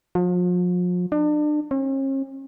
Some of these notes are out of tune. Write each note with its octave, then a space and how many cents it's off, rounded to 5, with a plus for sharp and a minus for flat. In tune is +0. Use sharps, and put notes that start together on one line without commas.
F3 +40
D4 +35
C#4 -45